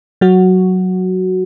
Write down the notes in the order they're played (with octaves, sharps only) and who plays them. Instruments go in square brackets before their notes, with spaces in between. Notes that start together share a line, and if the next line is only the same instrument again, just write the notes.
[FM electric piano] F#3 F#4